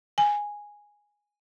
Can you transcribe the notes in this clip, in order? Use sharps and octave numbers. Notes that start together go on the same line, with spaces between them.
G#5